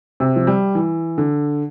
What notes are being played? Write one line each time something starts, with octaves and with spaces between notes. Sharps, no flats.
C3
F3
G3
E3
D3